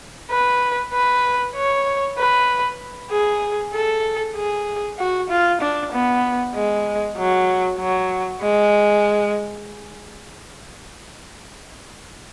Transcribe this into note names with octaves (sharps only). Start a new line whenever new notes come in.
B4
B4
C#5
B4
G#4
A4
G#4
F#4
F4
D4
B3
G#3
F#3
F#3
G#3